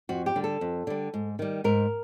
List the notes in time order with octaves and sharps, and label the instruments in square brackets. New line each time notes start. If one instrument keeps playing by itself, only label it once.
[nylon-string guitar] F2 F#4
G4
D3 G3
A4
F2
D3 G3
G#2
D#3 G3
G#2 A#4